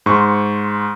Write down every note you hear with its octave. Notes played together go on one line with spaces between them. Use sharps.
G#2 C6 C#6